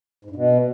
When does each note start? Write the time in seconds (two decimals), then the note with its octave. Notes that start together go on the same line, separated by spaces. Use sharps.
0.25 G#2
0.30 G2
0.36 B2